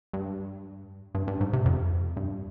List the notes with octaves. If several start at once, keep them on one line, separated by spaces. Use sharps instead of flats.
G2
G2
G2
G#2
C3
F2
G2